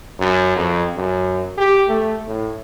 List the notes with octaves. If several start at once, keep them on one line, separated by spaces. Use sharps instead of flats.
F#2
F2
F#2
G4
A3
A2